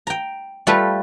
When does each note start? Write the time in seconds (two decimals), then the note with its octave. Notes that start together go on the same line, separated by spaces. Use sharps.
0.07 G5 A#5
0.67 G3 A3 F4 A4 B4